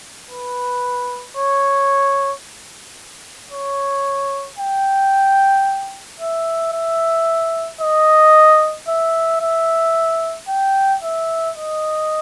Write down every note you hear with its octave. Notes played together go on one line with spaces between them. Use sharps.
B4
C#5
C#5
G5
E5
E5
D#5
E5
E5
G5
E5
D#5